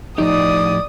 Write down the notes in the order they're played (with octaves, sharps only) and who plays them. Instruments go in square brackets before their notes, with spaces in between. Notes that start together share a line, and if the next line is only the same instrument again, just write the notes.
[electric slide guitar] A2 F3 G4 [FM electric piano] D#4 D#5 [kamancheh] D5 D#6